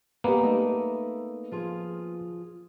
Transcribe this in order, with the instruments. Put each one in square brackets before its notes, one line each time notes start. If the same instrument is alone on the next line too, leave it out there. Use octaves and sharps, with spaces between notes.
[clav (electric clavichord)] A#3 B3 [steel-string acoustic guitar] G4 D5 G#5
[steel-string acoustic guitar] A3 D#4
F3 F4 G#4